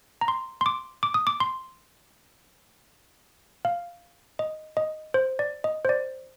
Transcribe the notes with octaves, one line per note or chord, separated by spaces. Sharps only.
A#5
C6
C6
D6
D6
D#6
D6
C6
F5
D#5
D#5
C5
D5
D#5
C5
D5